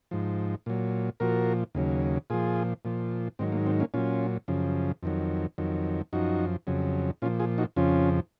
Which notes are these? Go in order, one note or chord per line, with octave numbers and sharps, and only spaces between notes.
G#2 F3
A#2 F#3
A#2 F3 F#4 A#4
D#2 C#3 F#3
A#2 F3 F4 G#4
A#2 F3
G#2 D#3 F#3 C4
A#3
C4
A#3 C#4
A#2 F#3 C#4 F4
F#2 C#3 F3
F2 D#3 F#3
F2 D#3 F#3
F#2 F3 D#4 F#4
F2 C#3 F#3
A#2 F3 C#4 F4
F4 G#4
D#4 F#4
F2 C#3 F3 C#4 F4